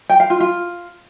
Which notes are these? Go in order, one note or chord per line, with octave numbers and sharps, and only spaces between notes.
G5
F5
F4
F4